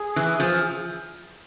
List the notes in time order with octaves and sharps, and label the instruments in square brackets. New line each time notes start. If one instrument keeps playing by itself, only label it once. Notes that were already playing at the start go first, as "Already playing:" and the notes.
Already playing: [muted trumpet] G#4
[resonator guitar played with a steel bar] E3
F3